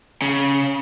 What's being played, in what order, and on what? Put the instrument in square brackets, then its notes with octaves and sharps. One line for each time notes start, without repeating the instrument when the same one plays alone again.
[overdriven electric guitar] C#3